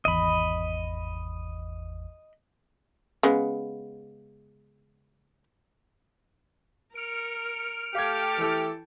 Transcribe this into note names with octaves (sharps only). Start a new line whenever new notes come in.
G#1 E2 D#5 B5
C#3 G#3 B3
A#4 F6 C#7 D7
A3 G4 F5 G5 A5 G#6
E3 E4 A4